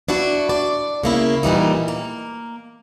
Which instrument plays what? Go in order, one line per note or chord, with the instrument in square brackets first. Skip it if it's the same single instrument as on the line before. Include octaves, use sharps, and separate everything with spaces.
[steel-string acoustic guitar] D4 E4 F#4
D5
C#3 A#3 E4
A#2 E3 G3 D#4
A#3